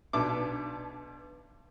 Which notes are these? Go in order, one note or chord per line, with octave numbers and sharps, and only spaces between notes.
B1 B2 D4 D6